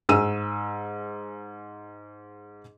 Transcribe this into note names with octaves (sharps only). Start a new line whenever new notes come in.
G#2 G#4 E6 D#7